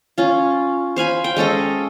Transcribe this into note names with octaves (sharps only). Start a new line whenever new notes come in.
C#4 F4
C5 F5 G#5 B5
G5
G#3 C#4 A4 D#5